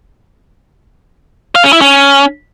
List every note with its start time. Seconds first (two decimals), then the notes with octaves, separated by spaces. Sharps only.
1.55 F5
1.64 C#4
1.73 E4
1.81 C#4